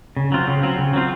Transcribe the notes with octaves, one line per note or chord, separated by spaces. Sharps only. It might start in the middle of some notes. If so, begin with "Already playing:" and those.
C#3
F#3 C4 F4
C#3
F#3 C4 F4
C#3
F#3 C4 F4